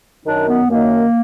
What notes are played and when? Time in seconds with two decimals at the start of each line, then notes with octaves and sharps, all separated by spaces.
0.24 F#2 D#3 D4
0.47 B3
0.69 F#2 D#3 A#3